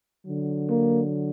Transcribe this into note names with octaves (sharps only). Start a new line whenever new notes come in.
D3 F#3
A#3